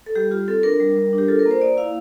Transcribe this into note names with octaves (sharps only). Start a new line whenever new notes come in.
A4
G3 G4
F4 G4
C4 A4
D4 A#4
G3
G3
D4
G4
F4 A4
A#4
A#3
C5
A#3 D5
E4 F5